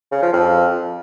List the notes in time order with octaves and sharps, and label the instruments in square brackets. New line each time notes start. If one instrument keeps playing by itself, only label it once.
[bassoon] C#3
F3
F2